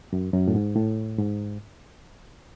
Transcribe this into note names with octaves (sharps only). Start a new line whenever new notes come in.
F#2
F#2
A2
G#2
A2
G#2